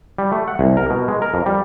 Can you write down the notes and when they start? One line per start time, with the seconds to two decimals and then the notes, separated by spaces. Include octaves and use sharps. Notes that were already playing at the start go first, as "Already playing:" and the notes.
0.18 G3
0.32 A3
0.48 F#5
0.59 C2
0.77 A#4
0.90 B2
1.08 G#3
1.22 A#4
1.34 F2
1.46 G3